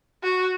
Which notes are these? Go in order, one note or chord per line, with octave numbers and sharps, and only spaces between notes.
F#4